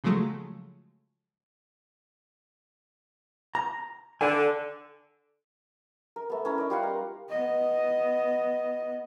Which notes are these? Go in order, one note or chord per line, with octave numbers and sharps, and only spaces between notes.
C#3 F3 F#3 G#3 A3
A#5
D3 G#5
A#4
A3 B3
C#4 E4 A#4
D#4 D5
G3 F4 F5 F#5
A#4
B3 D#5